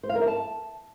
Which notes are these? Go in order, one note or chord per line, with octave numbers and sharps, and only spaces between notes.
C5
F5
A#4
E5
A5